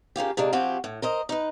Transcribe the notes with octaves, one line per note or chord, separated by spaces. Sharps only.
C#3 A#3 F4 G4
C3 G#3 A#3 D4
F3 C4 E4 F#4 G4
A2
A#4 C5 D#5
D#4 B4